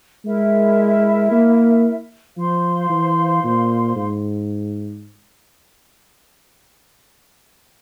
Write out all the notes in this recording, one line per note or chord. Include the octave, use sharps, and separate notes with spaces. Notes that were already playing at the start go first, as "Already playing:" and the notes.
G#3 E4 A#4 E5
A#3
F3 C5 F5 C6
E3
A#2
G#2